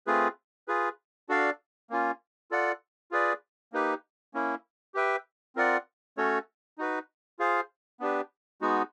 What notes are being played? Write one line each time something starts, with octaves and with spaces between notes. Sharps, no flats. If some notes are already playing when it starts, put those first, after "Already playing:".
A3 C4 F4 G#4 B4
F4 G#4 B4
D4 F#4 A4 D5 F5
A#3 C#4 F4
F4 A4 D5 F#5
F4 G#4 B4 D5
A#3 D#4 G4 B4
A#3 C#4 E4
G4 B4 E5 G5
C4 F4 A#4 D5 F#5
A3 C#4 F#4 A4 C#5
D#4 F#4 B4
F4 G#4 C5 F5
B3 D4 G4 B4
G#3 B3 D#4 F#4